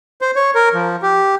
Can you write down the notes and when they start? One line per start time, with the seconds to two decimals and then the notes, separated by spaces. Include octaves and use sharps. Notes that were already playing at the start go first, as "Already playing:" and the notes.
0.21 C5
0.36 C#5
0.55 A#4
0.74 F3
1.02 G4